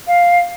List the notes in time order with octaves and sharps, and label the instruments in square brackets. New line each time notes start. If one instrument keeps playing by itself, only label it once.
[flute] F5